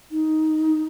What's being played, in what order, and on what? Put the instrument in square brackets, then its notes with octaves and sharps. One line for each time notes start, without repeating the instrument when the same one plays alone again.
[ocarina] D#4